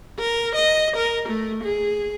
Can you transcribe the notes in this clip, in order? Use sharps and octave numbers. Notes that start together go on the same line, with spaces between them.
A#4
D#5
A#4
A3
G#4